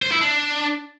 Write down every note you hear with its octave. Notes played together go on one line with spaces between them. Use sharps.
C5
E4
D4